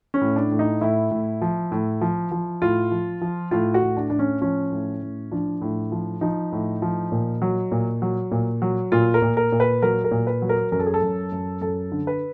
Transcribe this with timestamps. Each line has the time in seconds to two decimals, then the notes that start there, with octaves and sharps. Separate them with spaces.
0.14 C#4
0.21 A2
0.36 D4
0.51 A2
0.59 D#4
0.81 A2 E4
1.11 A2
1.42 F3
1.72 A2
2.01 F3
2.32 F3
2.62 A2 F4
2.91 F3
3.21 F3
3.51 A2 F4
3.74 F#4
3.82 A2
3.97 D4
4.10 A2 D4
4.19 C#4
4.41 F3 C#4
4.72 A2
5.02 A2
5.32 F3 D4
5.62 A2
5.92 F3
6.21 F3 D#4
6.52 A2
6.82 F3
7.12 A#2
7.42 F#3
7.72 A#2
8.02 F#3
8.31 A#2
8.62 F#3
8.92 A#2 F4
9.14 A#4
9.22 A#2
9.37 A#4
9.52 A#2
9.60 B4
9.82 F#3 A#4
10.04 A#4
10.11 A#2
10.27 B4
10.42 F#3
10.49 A#4
10.72 F#2 A#4
10.79 A4
10.86 G#4
10.94 A4
11.02 F#2
11.32 F#2
11.61 F#2 A4
11.92 D3
12.07 B4